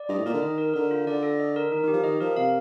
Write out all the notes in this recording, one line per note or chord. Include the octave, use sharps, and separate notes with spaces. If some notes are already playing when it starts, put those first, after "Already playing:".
Already playing: D5
G2 D#5
A2
A#2 A#4
D3
D#3 D#5
A#4
D3 A#4
F4
D3 D5
A4
D#5
A#4
D#3 A#4
D#3 G4
F3
D#3 D#5
F3 A#4
C3 F5